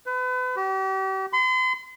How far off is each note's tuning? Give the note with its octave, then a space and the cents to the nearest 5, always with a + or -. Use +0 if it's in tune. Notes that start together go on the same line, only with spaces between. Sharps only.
B4 +35
G4 -40
C6 -40